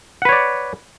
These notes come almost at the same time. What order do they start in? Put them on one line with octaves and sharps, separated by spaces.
F#5 B4 C#5 D5